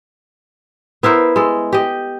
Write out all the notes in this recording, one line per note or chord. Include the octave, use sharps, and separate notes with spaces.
B3 E4 A#4 C5
G#3 A4
G4 D#5